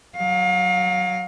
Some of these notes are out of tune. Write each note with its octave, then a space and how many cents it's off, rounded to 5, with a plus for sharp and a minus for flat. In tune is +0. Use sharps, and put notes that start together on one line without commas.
F#3 +0 F5 +30